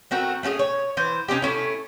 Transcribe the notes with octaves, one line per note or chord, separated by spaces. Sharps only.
A3 C4 F#4 A#4
A3 C#4 F#4 G#4
C#5
E3 C5
C3 C#4 D#4 G4
A3 C#4 E4